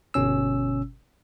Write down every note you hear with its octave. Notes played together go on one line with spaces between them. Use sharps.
G1 B2 C#4 E6